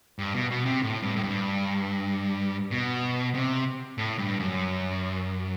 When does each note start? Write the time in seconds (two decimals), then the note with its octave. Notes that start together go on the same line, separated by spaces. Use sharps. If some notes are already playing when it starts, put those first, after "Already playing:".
0.19 G2
0.34 B2
0.51 B2
0.66 C3
0.82 A2
1.03 G2
1.16 A2
1.23 G2
2.71 B2
3.35 C3
3.98 A2
4.18 G2
4.40 F#2